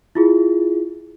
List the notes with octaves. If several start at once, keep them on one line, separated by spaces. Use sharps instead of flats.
E4 F4 G#4